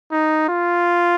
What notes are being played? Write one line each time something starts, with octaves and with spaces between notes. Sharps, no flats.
D#4
F4